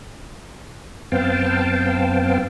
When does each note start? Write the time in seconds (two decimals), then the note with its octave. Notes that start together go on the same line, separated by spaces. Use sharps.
1.12 F#2 B3 C4 F5 G5 A5